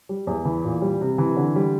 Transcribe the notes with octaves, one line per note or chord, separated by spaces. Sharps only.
G3
E2
E3
A#2
G3
C3
E3
D3
G3